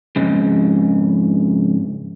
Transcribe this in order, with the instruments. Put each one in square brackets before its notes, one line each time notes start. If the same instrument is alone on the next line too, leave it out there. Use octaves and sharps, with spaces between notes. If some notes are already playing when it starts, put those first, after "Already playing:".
[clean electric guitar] F2 G#2 C#3